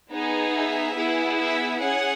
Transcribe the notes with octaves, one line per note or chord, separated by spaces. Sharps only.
B3 D#4 G#4
E5
B3 E4 G#4
E5
C#4 G#4 F#5